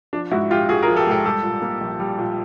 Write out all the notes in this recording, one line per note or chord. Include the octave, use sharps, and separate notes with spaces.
F3 D4
G#2 E4 F#4
A#1 F4 G4
A#1 F#4 G#4
G#4 A#4
F3
G4 A4
G#2 G4 A4
G3 G4 A4
A#2
A#3
A#1
G3
A#2